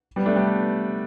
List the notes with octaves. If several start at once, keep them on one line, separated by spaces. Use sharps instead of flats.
G3 B3
A3 D4
G3 B3